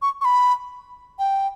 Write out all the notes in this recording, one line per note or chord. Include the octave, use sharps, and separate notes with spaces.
C#6
C#6
B5
G5